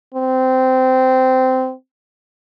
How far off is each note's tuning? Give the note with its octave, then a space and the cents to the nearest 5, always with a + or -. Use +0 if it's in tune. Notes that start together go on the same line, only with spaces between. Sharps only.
C4 -15